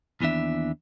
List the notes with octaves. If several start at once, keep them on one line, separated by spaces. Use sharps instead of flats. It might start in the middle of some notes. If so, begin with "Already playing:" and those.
D#2 E3 B3 D4 E5